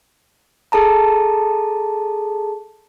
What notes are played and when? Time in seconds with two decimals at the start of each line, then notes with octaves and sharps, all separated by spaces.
0.72 G#4 A4 A5 A#5